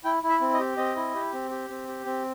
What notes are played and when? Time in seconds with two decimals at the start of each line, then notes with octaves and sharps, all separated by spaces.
0.04 E4 G5
0.23 E4
0.29 E5
0.41 C4
0.54 D#5
0.59 G4
0.77 C4 D#5
0.96 E4
1.15 G4
1.33 C4
1.51 G4
1.70 C4
1.88 G4
2.06 C4